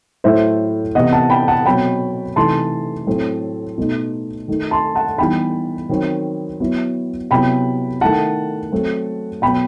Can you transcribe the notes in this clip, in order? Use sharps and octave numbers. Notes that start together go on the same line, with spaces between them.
A2 F#3 A3 E4 C5 E5
C3 E3 B3 E4 D#5 F#5
F#5 A5
G5 B5
F#5 A5
B2 F#3 C4 G5 B5
C3 E3 A3 D#4 A5 C6
A2 F#3 A3 C4
B2 A3 D#4
D#3 A3 D#4
A5 C6
F#5 A5
E3 G3 B3 D#4 G5 B5
D#3 F#3 C4
F#3 B3 E4
C3 F#3 B3 E4 G5 B5
D#3 A3 E4 F#5 A5
F#3 A3 C4
B2 F#3 B3 G5 B5